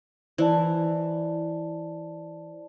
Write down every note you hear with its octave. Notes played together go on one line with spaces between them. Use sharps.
E3 C5 D5 A5